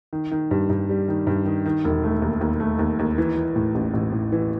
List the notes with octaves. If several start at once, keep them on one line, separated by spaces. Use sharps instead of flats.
D#3
D#3
G2
G2
G3
D#3
G2
D#3
D#3
E1
A3
D#2
D#2
A3
D#2
D#2
E3
E3
A2
A1
A1
A2
E3